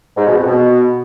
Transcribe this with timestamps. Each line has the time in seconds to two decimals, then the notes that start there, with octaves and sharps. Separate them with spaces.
0.17 G#2
0.26 B2
0.36 F2
0.45 B2